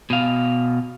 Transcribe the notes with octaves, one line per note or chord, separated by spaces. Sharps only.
B2 F5